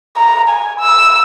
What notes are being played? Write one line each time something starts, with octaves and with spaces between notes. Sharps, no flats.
A#5
G#5
E6